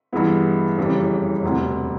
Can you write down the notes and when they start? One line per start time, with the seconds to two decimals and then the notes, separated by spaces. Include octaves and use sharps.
0.12 G2 E3 G#3 B3 E4
0.78 F#1 F2 C#3 E3 G3
1.43 E1 D2 C3